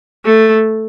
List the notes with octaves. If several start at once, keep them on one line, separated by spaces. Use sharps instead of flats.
A3